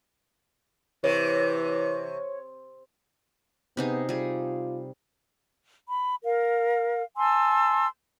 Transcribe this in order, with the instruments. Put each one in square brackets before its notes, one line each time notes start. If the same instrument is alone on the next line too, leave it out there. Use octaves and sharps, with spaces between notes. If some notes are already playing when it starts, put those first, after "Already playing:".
[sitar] C3 [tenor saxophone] E3 [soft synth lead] C#5
[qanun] C3 D#4 G#4 [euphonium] B3
[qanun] G3 G#4 [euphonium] F4
[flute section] B5
A#4 F5
G#5 A5 C6 E6